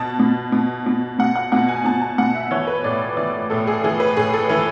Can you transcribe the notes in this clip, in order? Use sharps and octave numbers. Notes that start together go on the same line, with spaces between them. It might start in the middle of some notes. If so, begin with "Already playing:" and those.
Already playing: B2 A5
B2
B2
B2
B2 F#5
F#5
B2 F#5
G#5
B2 A5
A5
B2 F#5
E5
E3 C#5
B4
A2 D5
E3 D5
A2 A4
G#4
E3 G#4
B4
A2 G#4
A4
E3 B4